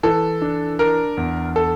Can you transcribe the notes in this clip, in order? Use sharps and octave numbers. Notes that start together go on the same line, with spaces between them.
E3 A4
D4
D4 A#4
E2
A4